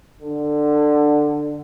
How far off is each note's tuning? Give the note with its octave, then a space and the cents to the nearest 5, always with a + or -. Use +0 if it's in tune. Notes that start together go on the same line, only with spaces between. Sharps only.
D3 +15